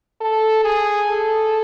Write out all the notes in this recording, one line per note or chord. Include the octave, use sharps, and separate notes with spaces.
A4
G#4
A4